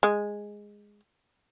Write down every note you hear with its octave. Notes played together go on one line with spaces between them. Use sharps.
G#3